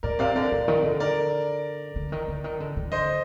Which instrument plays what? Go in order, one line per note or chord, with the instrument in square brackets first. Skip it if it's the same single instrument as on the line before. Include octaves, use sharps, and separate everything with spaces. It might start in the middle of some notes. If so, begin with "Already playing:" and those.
[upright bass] A#2 [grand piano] A#4 D5
[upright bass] C3 [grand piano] D5 F5
[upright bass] D3 [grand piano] A#4 D5
[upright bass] A#2
D#3
D3
[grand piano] A#4 D5
[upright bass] D3
D#3
D3
D#3
D3
D#3
[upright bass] D3 [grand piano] C5 D#5